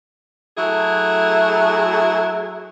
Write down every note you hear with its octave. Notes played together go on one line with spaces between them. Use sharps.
F#3 A3 E4 G#4